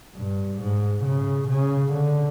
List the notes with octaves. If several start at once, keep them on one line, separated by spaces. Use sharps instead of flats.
G2
G#2
C#3
C#3
D3